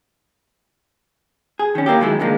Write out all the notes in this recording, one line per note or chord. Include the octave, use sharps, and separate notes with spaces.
G#4
D#3 C#4
A#3 E4 G4
F#2 D#3 F#3 G#3 E4
C#2 D3 D#3 F3 G#3 A#3